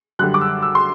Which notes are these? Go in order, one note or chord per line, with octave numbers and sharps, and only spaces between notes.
F#2 D3 G3 F#6
D6
E6
E6
C6